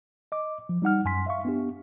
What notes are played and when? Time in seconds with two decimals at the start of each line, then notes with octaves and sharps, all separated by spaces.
0.32 D#5 D6
0.69 F3
0.82 G3 D#4 F#5 F6
1.05 F#2 G#5 C6 B6
1.26 E5 F5 C#6
1.45 B3 D4 G4